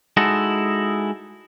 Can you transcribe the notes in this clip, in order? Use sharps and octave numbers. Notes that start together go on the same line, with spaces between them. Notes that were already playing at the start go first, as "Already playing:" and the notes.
G#3 D#4 E4 F#4 A4